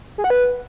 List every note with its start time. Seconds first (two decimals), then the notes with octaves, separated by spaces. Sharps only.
0.18 G#4
0.24 F#5
0.30 B4